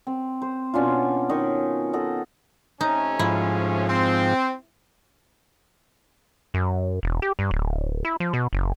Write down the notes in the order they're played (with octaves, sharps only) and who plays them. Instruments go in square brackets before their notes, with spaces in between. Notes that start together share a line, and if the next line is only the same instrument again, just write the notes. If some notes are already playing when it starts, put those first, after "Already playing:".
[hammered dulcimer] C4
C5
B2 C#4 D4 F4
D#3 D#4 C#5 D#5
A4 D#5 F#5
[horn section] C3 A3 C#4 [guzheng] D#4
[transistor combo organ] G#2 F3 [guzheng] E4
[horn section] C4
[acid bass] F#2
E1
G4
G2
D1
E4
F3
B2
F#1